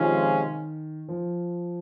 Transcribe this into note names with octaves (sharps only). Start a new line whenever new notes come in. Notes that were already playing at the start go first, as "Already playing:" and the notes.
Already playing: C3 D#3 F3 G#3 C#4 F4
F3